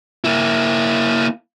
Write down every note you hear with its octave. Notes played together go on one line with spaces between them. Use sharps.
A#3 E4